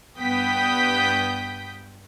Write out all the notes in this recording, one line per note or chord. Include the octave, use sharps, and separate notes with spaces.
G2 B3 G5 D#6 G6 B6